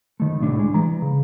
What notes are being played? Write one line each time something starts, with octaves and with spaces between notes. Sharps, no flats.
D#3 A3
C2 A2 D4
G#3
E3 A#5
C#3